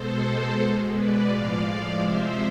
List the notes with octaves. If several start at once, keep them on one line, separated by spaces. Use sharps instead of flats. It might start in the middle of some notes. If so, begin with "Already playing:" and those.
Already playing: B2 G#3 A4 C5
B2 G#3
B4 D5
A2 F3 G#3 D5 F5
C3 F3 G#3 C5 E5